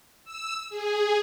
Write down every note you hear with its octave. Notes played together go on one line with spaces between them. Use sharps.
E6
G#4